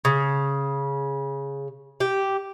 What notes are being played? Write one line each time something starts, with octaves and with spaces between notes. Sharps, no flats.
C#3
G4